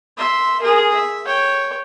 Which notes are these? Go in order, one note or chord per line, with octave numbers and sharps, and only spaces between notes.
E5 C6
G#4 A#4
E5
C#5 G5